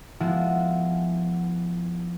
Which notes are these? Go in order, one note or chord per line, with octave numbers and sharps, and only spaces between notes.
F3 G#3 B3 E4 F#4